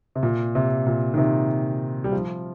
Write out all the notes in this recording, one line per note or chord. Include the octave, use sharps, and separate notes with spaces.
C3
A#2
C3
A#2
D#3
C3
G3
F3